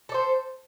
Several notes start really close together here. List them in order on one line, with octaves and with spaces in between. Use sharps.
A4 D5 C5